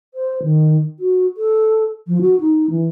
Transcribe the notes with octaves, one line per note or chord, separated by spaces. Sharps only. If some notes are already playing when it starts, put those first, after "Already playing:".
C5
D#3
F#4
A4
F3
F#4
D#4
E3